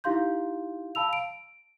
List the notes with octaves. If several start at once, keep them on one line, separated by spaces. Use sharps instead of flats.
D#4 E4 G4 F5 C6 G6
F5 A5 B5 E6 F7
D7